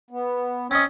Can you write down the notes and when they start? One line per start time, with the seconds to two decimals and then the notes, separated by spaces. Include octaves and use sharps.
0.10 B3
0.71 C4 C#4 D#5